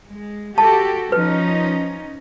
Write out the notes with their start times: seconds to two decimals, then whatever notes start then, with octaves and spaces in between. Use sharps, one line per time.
0.11 G#3
0.58 F#4 G4 A4 A5
1.12 F3 C#4 D#4 B4